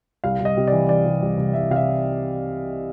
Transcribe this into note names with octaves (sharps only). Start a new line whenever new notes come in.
C2 F5
C2
D#5
C3
E3 D5
E3 D5
C3
C2
C2
C2 E5
C3 F5
E5